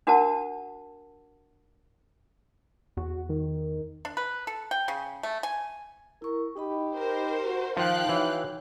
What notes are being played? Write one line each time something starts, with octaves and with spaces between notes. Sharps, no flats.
D4 F#4 A#4 F#5 A5
E2 F#4
D#3
D4
B4
A4
G5
C#3
A3
G#5
E4 A#4 C#6
D#4 G4 D#5 B5
A#4 C5
F#4
D#3 F3 D#4 F5 G5 A5 F#6
E3 D#4 F#4 C#5